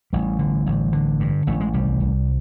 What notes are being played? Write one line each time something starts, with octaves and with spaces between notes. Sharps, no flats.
A1 G3
D3
A1
D3
G2
A1 A3
G#3
C2 G3
C2